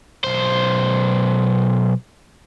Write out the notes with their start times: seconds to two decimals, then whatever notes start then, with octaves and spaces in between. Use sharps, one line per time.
0.24 B1 C5